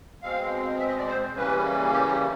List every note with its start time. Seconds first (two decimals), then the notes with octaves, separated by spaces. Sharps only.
0.22 B2 G#3 C4 F5
0.79 E5
0.89 D#5
0.98 D5
1.08 C5
1.36 C#3 E3 G3 A#3 C#4 B4
1.93 G4
2.07 G4